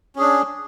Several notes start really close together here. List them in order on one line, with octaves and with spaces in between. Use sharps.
C#4 G#4 D4